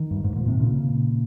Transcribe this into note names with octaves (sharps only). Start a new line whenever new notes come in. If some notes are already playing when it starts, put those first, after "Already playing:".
Already playing: D#3
G2
G#2
A#2
C3
A#2 C#3